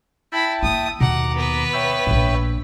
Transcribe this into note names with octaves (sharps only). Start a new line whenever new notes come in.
E4 E5 G5 A5 B5
A#3 E4 D#6
D#2 B2 F#5 A#5 D6
B3 B4
C#5 E5 G5
A#1 A#2